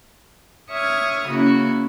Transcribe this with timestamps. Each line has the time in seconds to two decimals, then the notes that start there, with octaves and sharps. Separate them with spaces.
0.70 C#5 E5 C#6 D#6 F6 G#6
1.28 C#3 A#3 C#4 E4 F#4